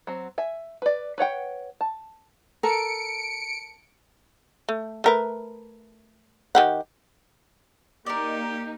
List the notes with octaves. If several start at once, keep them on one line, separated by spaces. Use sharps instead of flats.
F#3 C4
E5 G#5
B4 D5
B4 C#5 F#5 G5
A5
A4 A#4 C#7 D7
A3
A3 A#4 B4
D#3 G4 F#5
A#3 D#4 G4 A#4 D5